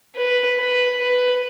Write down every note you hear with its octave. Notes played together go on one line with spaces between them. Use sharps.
B4
B4
B4